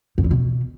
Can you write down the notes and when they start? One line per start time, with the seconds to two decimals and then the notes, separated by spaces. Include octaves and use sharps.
0.18 F2
0.24 E2
0.31 B2